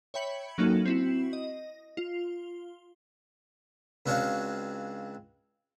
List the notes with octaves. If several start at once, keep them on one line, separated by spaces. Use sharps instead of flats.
C#5 E5 G5 B5 C#7 F#7
F#3 A#3 C#4 D#4 F#4 A4
C4 E4 F#4
D#5
F4
C#2 C4 D4 F#4 C#5 F5